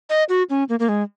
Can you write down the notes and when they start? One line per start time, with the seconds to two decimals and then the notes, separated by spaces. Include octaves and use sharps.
0.10 D#5
0.29 F#4
0.50 C#4
0.69 A#3
0.80 A#3
0.89 G#3